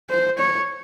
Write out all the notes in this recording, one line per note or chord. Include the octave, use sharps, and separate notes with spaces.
C5
C#5